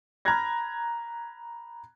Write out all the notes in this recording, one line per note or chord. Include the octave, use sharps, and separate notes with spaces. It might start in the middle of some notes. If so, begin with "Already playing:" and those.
A#5 B5 F6 F#6 G#6 A#6